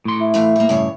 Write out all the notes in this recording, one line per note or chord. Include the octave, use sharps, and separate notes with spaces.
A2 C6
E4
E3 A3 F5
G3 A#3
G2 C#3 C#5